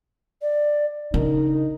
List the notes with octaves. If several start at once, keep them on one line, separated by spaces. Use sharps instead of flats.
D5
C#3 D4 D#4 A#4